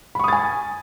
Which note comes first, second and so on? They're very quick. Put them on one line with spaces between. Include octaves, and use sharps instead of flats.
B5 C#6 D#6 A6 G#5